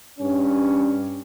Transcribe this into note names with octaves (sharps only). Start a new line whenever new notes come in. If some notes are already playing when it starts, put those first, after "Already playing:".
G2 C#4